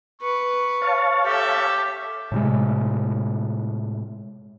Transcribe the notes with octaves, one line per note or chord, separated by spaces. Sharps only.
B4 C#6
C#5 F5 A5
G4 A4 E5
A2 C3 G#3